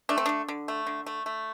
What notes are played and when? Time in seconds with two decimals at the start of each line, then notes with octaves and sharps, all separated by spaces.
0.09 A3 D4
0.18 C4
0.26 D3 D4
0.48 D3
0.68 A3
0.87 D3
1.06 A3
1.26 A3